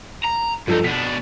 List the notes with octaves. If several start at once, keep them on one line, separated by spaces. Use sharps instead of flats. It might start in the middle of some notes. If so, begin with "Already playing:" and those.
A#5
G2 F3 D#4 A4
B2 D4 B6